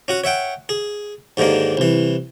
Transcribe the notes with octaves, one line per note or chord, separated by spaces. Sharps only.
C#4 F#4 F#5
C#5 E5 F#5 G5
G#4
D#2 G#2 D3 D#3 A#3
C2 E3